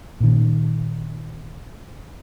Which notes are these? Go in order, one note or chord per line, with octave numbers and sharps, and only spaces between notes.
A#2 D#3